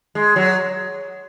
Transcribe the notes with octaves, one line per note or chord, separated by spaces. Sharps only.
G#3
F#3